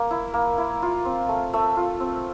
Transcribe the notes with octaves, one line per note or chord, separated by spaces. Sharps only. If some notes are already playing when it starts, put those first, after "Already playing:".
Already playing: A#3
E4
A#3
E4
F4
C4
A3
A3 E5
F4
C4